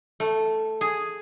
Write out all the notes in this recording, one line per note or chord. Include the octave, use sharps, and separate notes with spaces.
A3
G#4